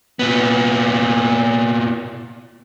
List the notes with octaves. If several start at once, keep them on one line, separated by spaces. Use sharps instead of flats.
A#2 B3